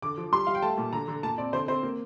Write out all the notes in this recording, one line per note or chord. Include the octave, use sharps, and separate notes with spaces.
D3 D6
F3
G3 C6
G3 F5
G5
A3 A5
A#2
D3 A#5
D3
A#2 A5
C4 D5
D3 C5
C4 C5
A#3